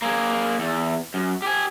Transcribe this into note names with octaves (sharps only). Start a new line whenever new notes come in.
A#3 G#4
E2
F#2
G4 G#5